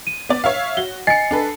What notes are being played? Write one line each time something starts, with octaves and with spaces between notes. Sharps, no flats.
D#7
B3 D5
C#5 E5 F5
F#4 G7
D#5 G#5 A6 C7 C#7
D4 A4 B4